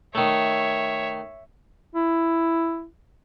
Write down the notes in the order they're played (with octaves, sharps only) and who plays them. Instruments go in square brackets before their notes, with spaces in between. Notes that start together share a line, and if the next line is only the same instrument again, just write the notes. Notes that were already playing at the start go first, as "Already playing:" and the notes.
[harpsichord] D#3 A3 [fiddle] C#5 E5
[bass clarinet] E4